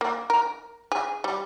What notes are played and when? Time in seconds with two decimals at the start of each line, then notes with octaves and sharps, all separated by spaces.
0.01 A#3
0.30 A#4
0.92 G#4
1.24 G3